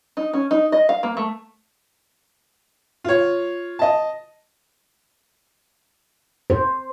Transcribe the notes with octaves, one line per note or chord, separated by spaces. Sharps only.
D#4
C#4
D#4
D#5
F5
A#3
A3
F4 C#5
D#5 A5
C5